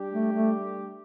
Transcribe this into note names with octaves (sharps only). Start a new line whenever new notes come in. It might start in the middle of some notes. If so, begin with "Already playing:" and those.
Already playing: G3 D4 G4
A3
A3